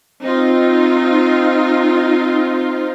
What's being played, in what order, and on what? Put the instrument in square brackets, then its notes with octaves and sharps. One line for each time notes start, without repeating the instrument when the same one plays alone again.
[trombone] C4 [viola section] D#4 F4